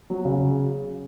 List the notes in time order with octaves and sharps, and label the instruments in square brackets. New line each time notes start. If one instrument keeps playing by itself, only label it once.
[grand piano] F#3
C#3